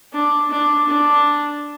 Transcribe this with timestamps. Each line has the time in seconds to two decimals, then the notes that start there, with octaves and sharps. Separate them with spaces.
0.13 D4
0.51 D4
0.88 D4